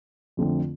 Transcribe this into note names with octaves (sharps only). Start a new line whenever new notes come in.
F2 D3 A3 C4